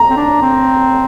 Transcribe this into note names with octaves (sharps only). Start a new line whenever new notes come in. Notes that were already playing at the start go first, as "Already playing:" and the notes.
Already playing: A#5
C4
D4
C4